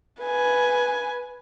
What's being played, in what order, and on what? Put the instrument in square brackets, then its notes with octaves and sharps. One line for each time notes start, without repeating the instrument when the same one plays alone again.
[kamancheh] B4 G#5